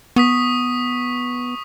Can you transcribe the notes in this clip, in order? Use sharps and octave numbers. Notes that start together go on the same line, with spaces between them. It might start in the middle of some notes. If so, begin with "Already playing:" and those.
B3 C#6 D#6 B6